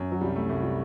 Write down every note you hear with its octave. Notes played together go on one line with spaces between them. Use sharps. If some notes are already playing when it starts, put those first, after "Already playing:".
Already playing: F#2
F#3
C2 G3
A3
C2 A3
G3